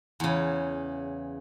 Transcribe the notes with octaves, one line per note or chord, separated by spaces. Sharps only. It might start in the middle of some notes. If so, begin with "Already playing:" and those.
E2 C#3